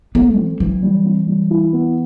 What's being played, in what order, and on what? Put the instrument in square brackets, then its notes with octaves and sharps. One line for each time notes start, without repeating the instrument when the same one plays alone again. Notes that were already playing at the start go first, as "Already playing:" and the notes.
[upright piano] A3 [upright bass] B3
[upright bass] E3 [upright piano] C4
[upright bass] E3 [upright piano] F#3
[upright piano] G3
C4
G3
E4
B3